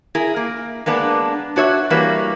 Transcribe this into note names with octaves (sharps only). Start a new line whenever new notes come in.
E4 G#4 A#4
A#3
G#3 A#3 B3 D4
D4 F#4 C#5 E5
E3 G3 A#3 F#4 B4